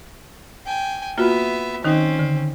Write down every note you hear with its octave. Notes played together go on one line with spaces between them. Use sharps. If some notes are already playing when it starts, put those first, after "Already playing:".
G5 G#5
A#3 B3 F4 F#4 E5
D#3 C4 C#4 D#4
D3